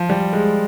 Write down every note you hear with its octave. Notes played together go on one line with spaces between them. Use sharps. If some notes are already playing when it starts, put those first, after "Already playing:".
Already playing: F3
G3
G#3